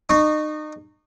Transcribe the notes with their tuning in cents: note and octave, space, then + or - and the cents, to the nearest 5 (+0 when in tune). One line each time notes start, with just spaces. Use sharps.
D#4 -30 C#6 +0